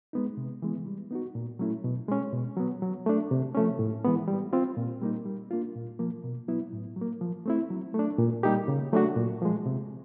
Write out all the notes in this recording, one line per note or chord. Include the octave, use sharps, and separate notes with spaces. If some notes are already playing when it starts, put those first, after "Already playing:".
G#3 B3 D#4
C3
E3 G#3 B3
G3
B3 D#4 F#4
A#2
F#3 A3 C#4 E4
B2
G#3 C#4
B2
F#3 B3
F#3
A3 D4
C3
F3 A3 C#4
A2
E3 G#3 B3
G3
C4 F4
A#2
G3 A#3 D#4
G3
A#3 D4 F4
A#2
F3 A#3
B2
F#3 B3 E4
A2
F#3
A#3
F3
A3 C4 E4
F#3
A3
D4
A#2
G3 A#3 D#4 G4
C#3
F#3 A3 D4 F#4
A#2
F3 G#3
C3